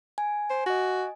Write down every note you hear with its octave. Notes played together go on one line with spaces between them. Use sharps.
G#5
C5
F#4 D#5 G#5